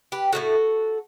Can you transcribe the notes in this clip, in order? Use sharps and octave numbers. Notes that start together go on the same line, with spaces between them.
G4 B4
A2 F#3 A3 F#4 A4